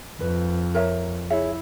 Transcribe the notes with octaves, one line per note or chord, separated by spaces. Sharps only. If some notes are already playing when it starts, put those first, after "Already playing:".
F2 B4
A#4 C#5 E5
E4 G#4 C#5 E5